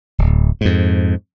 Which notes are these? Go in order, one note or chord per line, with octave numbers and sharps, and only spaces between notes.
D1
F2 G#2